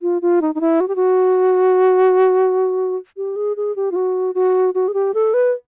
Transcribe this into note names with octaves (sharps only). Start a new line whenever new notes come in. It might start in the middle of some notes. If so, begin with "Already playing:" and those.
F4
F4
D#4
D#4
E4
F#4
G4
F#4
G4
G#4
G#4
G4
F4
F#4
F#4
F#4
G#4
G4
A4
B4